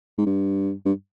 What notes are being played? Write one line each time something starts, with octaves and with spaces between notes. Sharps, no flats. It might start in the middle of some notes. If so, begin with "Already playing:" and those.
G#2
G2
G2